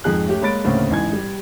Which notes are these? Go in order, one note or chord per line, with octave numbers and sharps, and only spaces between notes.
F2 G#2 G#4 F#6
A3 C#4 G4
G#3 A#3 C#5 B5 A6 D7
D2 A2 C#3 A#3 C4 C#4
A1 G#2 E3 G#5 G#6
G3